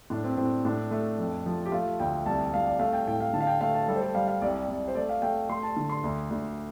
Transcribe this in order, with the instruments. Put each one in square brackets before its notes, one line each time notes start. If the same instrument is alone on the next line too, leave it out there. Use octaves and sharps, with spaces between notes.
[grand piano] A2 D4
C4
A2 C4
A2 D4
A3
F2
F3
G4
A3 F4
D2 G5
C2 A5
C2 F5
D5
A3 F5
G5
A2 G5
F5
D3 A5
F5
G5
A3 F5
A5
G3 A4
C5
A4
G3 F5
F5
C2 D5
C2
C5
A3 D5
F5
A3 G5
A3 C6
A5
D3
C6
D2
D2